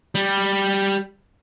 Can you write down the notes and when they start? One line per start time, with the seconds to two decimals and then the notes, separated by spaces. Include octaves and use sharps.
0.15 G3